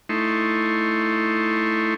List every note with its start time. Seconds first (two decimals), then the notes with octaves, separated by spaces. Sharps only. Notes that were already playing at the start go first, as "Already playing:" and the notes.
0.09 A3 D#4 E4 C6 C#6